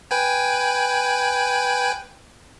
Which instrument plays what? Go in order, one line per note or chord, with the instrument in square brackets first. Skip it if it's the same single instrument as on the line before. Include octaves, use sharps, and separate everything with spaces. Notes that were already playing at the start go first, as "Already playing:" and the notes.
[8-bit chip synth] B4 G5 G#5